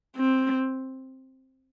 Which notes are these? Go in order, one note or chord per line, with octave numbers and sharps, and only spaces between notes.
C4